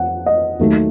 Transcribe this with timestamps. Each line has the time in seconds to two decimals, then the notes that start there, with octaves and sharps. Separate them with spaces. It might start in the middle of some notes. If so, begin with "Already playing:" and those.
Already playing: F2 F#5
0.26 D#5
0.59 D#2 D#3 F#3 A3 D#4